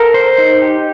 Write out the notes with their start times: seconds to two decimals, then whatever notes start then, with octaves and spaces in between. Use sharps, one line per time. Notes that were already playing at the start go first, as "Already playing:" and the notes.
Already playing: A4 A#4
0.14 C5
0.38 D#4
0.62 G4